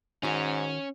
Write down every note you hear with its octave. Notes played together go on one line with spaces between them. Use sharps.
G#2 D#3 C#4 F#4